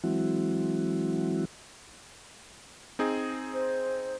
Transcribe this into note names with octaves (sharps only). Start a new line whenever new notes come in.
E3 F#3 G#3 C4 E4 F#4
C4 D#4 G#4
C5